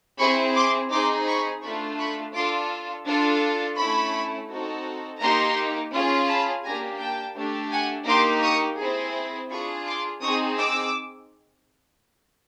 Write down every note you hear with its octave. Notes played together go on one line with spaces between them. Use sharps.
C4 E4 G#4 B5 C#6
C6 D6
C4 D#4 G#4 C6 D6
B5 C#6
A3 D4 F4 B5 C#6
B5 C#6
D4 F4 A4 C6 D6
D4 F4 A4
A3 C#4 E4 B5 C#6
C4 D#4 F#4 A4
A#3 D#4 G4 A#5 C6
C#4 F4 G#4
A5 B5
A#3 D4 G4 G#5 A#5
G5 A5
A3 D4 G4
F#5 G#5
A#3 D#4 G4 C6 D6
C#6 D#6
C4 E4 G#4
D4 F4 G#4 B5 C#6
C6 D6
C4 D#4 G#4 C#6 D#6
D6 E6